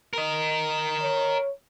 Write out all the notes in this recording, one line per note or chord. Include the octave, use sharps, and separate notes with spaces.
A#4 D#5
C#5